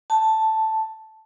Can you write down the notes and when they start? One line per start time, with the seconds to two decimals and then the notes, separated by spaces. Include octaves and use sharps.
0.10 A5